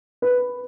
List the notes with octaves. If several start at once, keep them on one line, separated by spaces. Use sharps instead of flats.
B4